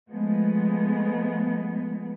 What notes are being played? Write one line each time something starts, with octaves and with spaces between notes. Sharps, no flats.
F3 G#3 A3 B3